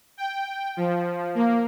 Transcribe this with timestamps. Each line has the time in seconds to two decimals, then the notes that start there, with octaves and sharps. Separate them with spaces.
0.17 G5
0.77 F3
1.35 A#3